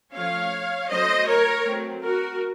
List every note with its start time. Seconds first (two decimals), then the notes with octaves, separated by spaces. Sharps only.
0.13 F3 A3 C#4 C#5 F5
0.89 F#3 A3 C#4 C5 D#5
1.27 A#4 C#5
1.64 F#3 A3 C4
2.02 F#4 A#4